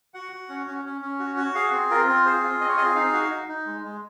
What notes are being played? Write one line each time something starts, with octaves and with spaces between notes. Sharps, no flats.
F#4 F#5
F#4
C#4
C#4
C#4
C#4
F#4
F#4
G#4 F5
C4
F4 A#4
C4
G#4 C5
F4
C4 D#5
C#5
G#4 D#5
D#4 F5
F#4
D#4
D#4
G#3
G#3